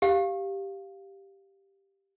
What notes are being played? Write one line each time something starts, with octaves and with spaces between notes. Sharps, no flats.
G4 F5